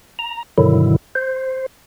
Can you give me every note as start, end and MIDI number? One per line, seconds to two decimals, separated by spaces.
0.19 0.43 82
0.58 0.96 43
0.58 0.96 47
0.58 0.96 50
0.58 0.96 51
0.58 0.96 54
0.58 0.96 64
1.15 1.66 72